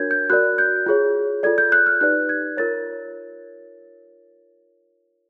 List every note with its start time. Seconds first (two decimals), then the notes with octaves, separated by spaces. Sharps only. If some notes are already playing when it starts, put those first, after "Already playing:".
Already playing: D4 F#4 A#4 C#5 G6 G#6
0.11 G6
0.30 F#4 A#4 D5 F#6
0.58 G6
0.86 F4 G#4 C#5
1.43 F4 A4 D5 G#6
1.58 G6
1.72 F#6
1.86 F6
2.01 D#4 G4 B4 D5 F#6
2.29 G#6
2.57 F4 A#4 C#5 A6